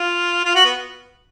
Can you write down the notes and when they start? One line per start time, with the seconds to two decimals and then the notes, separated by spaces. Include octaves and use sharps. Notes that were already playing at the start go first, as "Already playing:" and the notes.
Already playing: F4
0.45 F4
0.55 F#4
0.65 B3